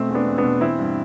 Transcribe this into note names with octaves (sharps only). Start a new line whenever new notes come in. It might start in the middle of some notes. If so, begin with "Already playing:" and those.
Already playing: B2 A3 C4
E2
B3 D4
E2
B3 D4
B2
E3 C4 E4
G2